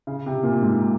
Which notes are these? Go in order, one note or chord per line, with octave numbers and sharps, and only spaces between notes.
C#3
C3
A#2
G#2